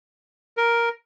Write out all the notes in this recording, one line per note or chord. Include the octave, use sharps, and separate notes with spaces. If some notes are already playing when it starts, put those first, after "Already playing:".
A#4